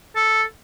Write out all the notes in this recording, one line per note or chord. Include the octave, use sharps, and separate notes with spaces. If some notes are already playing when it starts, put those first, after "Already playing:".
A4